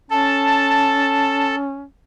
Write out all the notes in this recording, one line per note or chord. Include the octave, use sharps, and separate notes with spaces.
C#4 A4 A5